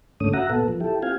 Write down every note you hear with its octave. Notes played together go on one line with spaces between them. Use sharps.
G#2 D3 A3 C#4 D#6
F#4 E5 F#5 A#5
A#2 B3 A4
F3
E4 G4 A4
C4 F4 G4 F5 G#5